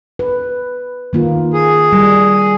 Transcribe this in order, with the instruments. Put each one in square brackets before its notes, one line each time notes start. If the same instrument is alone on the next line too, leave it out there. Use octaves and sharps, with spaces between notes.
[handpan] B4
D#3 A#3 F4
[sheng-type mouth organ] G#4
[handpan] G3